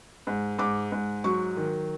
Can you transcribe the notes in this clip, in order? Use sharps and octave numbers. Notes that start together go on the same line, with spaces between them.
G#2
G#2 D6
G#2
F#3 C#6
D#3